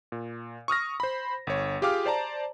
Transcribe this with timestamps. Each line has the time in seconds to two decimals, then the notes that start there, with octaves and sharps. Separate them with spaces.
0.12 A#2
0.68 C#6 D#6 F6 A#6
1.00 C5 B5
1.47 G1 C#5
1.82 F4 G4 G#4 F5 D6 F6
2.05 C5 D5 A5 A#5